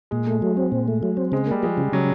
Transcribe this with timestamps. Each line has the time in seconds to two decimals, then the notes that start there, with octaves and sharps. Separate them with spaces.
0.11 A#2 G#3
0.27 A3
0.42 F#3
0.57 C4
0.72 A#2
0.88 A3
1.03 F#3
1.17 C4
1.32 C#3 G#3
1.47 G3 A#3
1.63 F3 G#3
1.77 C#3
1.93 C#3 F#3